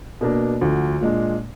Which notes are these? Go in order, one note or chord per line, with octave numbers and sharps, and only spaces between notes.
B2 A#3 D4
D2 D3 F3
A#2 G#3 D4